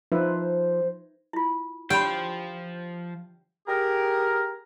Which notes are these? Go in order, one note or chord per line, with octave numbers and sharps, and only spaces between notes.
F3 D#4 B4 C5 E5
E4 F4
F3 G4 C5 C#5 G5 B5
G4 G#4 A#4